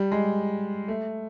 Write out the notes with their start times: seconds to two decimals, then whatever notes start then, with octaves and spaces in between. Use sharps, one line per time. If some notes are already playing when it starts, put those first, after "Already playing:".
Already playing: G3
0.12 G#3
0.88 A3